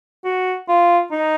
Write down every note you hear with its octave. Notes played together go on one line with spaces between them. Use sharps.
F#4
F4
D#4